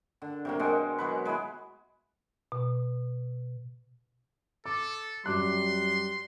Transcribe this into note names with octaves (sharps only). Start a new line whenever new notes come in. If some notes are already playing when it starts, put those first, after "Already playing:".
D3
C3 F#3 A#3
B2 G#3
F#3 G#3 B4
G#3 B3 E4 G#5
B2
A4 D6
F#2 G3 C6 D6 F#6